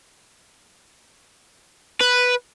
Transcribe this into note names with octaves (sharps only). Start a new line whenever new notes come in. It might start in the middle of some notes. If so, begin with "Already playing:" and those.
B4